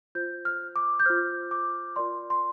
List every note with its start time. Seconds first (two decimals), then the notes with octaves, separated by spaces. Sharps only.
0.15 F4 C5 G6
0.45 F6
0.76 D6
1.00 G6
1.06 F4 C5 F6
1.51 D6
1.96 F4 A#4 D5 C6
2.30 C6